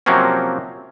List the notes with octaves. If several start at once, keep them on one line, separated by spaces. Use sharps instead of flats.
C3 F3 F#3 A#3 C4 C#4